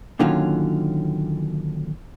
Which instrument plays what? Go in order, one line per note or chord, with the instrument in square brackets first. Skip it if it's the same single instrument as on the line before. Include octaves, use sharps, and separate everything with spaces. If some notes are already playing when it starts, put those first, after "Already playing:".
[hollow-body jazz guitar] A#2 D3 D#3 F#3 C#4 F4